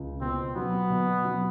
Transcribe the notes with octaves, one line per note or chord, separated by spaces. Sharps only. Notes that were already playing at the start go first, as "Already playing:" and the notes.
Already playing: C#2
B2 C4
F#3 B3
B2
F#3